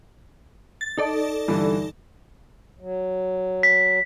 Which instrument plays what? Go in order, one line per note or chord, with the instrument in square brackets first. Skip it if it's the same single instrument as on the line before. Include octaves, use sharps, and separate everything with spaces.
[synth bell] A6
D#4 A4 D5
[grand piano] G2 D3 E3
[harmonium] F#3
[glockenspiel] B6